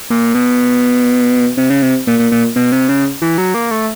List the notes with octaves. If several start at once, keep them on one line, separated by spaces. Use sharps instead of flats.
A#2
B2
C3
C#3
C3
A#2
A#2
A#2
B2
C3
C#3
E3
F#3
A#3
A3